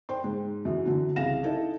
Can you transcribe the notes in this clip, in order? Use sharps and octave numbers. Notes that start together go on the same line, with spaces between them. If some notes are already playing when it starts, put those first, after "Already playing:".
C5 G5 C6
G#2
F#2 E3
D3 E3 F#3
C2 C#3 E3 F5 A#6 E7
D#4 E4 A4 D#5